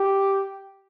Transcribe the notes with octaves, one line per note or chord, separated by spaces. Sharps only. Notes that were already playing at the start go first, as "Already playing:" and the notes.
Already playing: G4